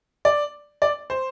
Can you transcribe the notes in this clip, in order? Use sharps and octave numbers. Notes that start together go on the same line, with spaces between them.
D5
D5
C5